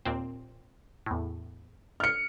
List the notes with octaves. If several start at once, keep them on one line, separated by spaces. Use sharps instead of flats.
D#2 A#2 C4
E2 A2
F6 C#7